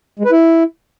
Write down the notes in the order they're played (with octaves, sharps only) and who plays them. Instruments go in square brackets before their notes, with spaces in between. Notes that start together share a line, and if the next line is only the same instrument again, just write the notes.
[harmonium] G#3
B4
E4